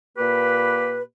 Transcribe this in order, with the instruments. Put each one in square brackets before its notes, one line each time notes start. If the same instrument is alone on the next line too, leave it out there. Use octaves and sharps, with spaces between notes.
[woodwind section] A#2 A#3 G4 B4